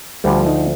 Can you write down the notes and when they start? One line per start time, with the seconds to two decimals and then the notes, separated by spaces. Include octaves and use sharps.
0.24 D2 D3 F3 G3
0.47 D#4